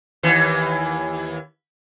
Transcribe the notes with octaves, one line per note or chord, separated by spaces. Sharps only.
D#2 E3